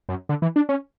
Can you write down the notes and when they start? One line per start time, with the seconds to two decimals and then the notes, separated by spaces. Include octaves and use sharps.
0.09 F#2
0.29 D3
0.42 E3
0.56 D4
0.69 C#4